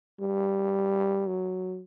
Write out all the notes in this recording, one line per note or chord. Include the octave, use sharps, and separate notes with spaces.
G3
F#3